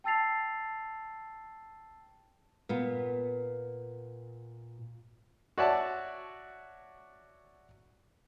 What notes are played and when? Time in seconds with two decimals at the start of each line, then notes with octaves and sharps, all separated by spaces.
0.04 G5 A5 E6 A6 C7 F7
2.69 A#2 B3
5.58 F#4 C#5 D5 E5 F#5 A5